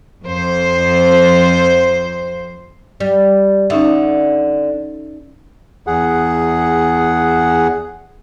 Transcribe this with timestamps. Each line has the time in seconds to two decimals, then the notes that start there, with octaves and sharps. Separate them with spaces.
0.23 F2 C5
3.00 G3
3.70 D3 C#4 D#4 E5
5.87 E2 G#4 F#5